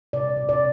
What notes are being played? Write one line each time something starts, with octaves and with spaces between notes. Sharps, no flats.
C3 D5
C3
D5